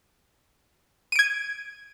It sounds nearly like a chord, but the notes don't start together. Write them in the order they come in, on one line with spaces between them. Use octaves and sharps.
D#7 D7 G#6